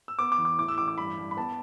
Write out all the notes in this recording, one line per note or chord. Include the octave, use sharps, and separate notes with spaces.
E6
B3 D6
D6
E2
D6
A2 D6
E6
A1 D6
D6
G2 B5
G2
B5
B3 A5